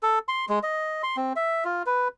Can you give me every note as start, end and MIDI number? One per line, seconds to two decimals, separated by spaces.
0.03 0.19 69
0.28 0.45 84
0.49 0.59 56
0.63 1.02 75
1.03 1.16 84
1.17 1.33 60
1.36 1.64 76
1.65 1.83 65
1.86 2.08 71